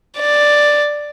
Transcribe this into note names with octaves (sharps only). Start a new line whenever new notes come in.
D5